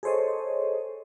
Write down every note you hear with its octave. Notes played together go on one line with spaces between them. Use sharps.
G#4 A4 C5 C#5 D#5